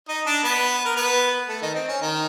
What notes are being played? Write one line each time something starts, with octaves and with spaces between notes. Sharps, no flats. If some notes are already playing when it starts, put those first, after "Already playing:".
D#4 D#5
D4 D5
B3 B4
A#4
B3 B4
A3 A4
D#3 D#4
C4
C#4
D#3 D#4